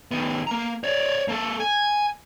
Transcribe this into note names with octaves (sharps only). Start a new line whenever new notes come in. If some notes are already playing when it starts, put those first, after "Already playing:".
D#3 B3
A#3 A#5
C#5 D5
A#3 A4
G#5